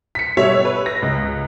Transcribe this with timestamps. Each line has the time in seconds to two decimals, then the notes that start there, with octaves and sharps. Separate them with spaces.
0.15 B6 C#7
0.37 B2 G3 C#5 E5 E6
0.65 B4
0.86 A#6
1.02 C#2